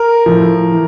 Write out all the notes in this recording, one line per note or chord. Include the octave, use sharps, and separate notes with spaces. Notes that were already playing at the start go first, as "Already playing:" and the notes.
Already playing: A#4
A2 F3
E3